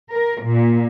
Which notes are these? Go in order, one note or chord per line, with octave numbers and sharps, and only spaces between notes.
A#4
A#2